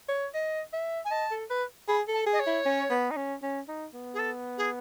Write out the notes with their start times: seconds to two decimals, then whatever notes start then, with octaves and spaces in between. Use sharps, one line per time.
0.08 C#5
0.34 D#5
0.73 E5
1.05 G#5
1.11 D#5 A5
1.31 A4
1.50 B4
1.88 G#4 B5
2.08 A4
2.13 A5
2.26 G#4
2.33 D#5
2.40 C#5
2.47 E4
2.66 C#4
2.90 B3
3.11 D#4
3.17 C#4
3.42 C#4
3.68 D#4
3.93 B3
4.14 G#4
4.19 A4
4.58 G#4